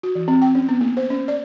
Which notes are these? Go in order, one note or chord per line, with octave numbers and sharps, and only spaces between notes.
F#4
E3
C4
G5
C#4
B3
A#3
C5
C#4
D5